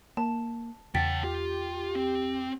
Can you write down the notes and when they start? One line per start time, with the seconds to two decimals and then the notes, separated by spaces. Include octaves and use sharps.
0.17 A#3 A5
0.95 E2 C#3 F#5 G5 A5 A6 B6
1.24 F4 G4
1.95 C4